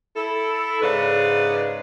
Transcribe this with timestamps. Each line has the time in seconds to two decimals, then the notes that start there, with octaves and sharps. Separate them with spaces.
0.16 E4 A4
0.82 G#2 C#3 B4 D5